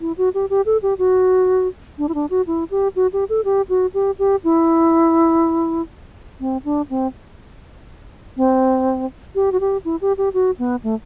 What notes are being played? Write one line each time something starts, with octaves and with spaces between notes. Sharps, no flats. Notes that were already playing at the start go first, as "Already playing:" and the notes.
E4
F#4
G4
G4
A4
G4
F#4
D4
E4
D4
F#4
E4
G4
F#4
G4
A4
G4
F#4
G4
G4
E4
C4
D4
C4
C4
G4
F#4
G4
E4
G4
G4
F#4
B3
A3